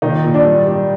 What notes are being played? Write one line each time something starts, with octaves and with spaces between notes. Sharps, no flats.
A#2 D#3 D#4
A#2
D4
G3
G3